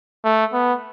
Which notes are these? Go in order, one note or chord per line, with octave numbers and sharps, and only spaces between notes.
A3
B3